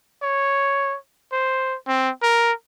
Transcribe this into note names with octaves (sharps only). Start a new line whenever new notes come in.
C#5
C5
C4
A#4